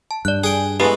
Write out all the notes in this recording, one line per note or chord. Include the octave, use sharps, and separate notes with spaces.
A5
G2 D5 F#6
G#4 G5 G#5
E3 G#3 A3 B3 F#4 G4